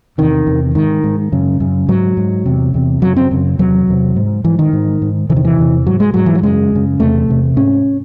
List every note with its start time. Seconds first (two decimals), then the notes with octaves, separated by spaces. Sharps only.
0.18 E2 C3 D#3
0.47 E2 C3
0.75 G#2 D#3
1.04 G#2
1.32 F#2 C#3
1.60 F#2 C#3
1.88 G#2 F#3
2.17 G#2
2.46 E2 C3
2.74 E2 C3
3.02 F#2 C#3 F#3
3.16 C4
3.31 F#2 C#3
3.59 E2 C3 F#3
3.87 E2 C3
4.16 G#2
4.44 G#2 E3
4.59 D#3
4.73 G#2
5.02 G#2
5.29 C3 E3
5.32 E2 D#3
5.45 E3
5.58 E2 C3
5.86 G#2 F#3
6.00 G#3
6.14 G#2 F#3
6.26 E3
6.35 F#3
6.43 F#2 C#3 G#3
6.72 F#2 C#3
7.00 E2 C3 A3
7.28 E2 C3
7.57 G#2 C#4